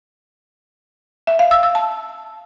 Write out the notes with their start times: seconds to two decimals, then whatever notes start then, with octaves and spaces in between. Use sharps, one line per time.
1.27 E5
1.39 F5
1.51 E6
1.63 E6
1.75 A5